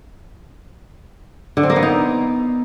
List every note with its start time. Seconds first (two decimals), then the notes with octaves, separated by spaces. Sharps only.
1.57 D3
1.63 C4
1.70 A#3
1.76 B3
1.83 D#4